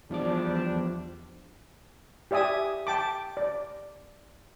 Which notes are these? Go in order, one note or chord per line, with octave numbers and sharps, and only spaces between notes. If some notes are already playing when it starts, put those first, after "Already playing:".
E2 F3 G3 D4 D6
G4 D5 E5 G#5 D#6
G5 A5 D6
D5